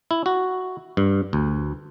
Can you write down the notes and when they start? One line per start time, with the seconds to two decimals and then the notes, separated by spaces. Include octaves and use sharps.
0.11 E4
0.26 F#4
0.97 G2
1.33 D2